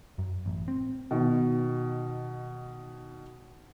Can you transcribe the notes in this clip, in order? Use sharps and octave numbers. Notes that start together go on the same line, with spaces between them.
F#2
A1
C4
B2 D#3 B3